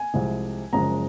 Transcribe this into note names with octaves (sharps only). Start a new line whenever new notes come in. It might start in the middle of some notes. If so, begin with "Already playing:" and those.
Already playing: G#5
C2 C3 F3 G#3
F#1 F#2 F3 G#3 A#5